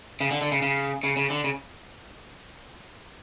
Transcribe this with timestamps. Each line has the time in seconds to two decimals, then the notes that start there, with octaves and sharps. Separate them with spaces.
0.21 C#3
0.31 D3
0.42 D3
0.52 C#3
0.62 C#3
1.03 C#3
1.17 C#3
1.30 D3
1.44 C#3